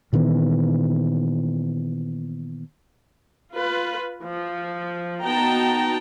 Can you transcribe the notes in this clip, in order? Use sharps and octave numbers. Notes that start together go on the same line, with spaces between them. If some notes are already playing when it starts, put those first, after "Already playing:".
A#2 D#3 E3 B3
F4 B4
F3
B3 D#4 F#4 G5 A5 A#5